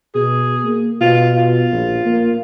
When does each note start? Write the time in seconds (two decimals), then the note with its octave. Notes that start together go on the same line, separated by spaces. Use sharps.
0.15 B2 G#4
0.64 A#3
1.01 B2 F4
1.37 F4
1.72 A#1
2.05 A#3